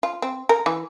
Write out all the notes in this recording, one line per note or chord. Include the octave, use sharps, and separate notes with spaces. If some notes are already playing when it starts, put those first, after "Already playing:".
F4
C4
A#4
E3